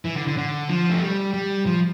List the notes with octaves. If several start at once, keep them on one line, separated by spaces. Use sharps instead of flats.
E3
D3
D3
D3
F3
A3
G3
G3
F3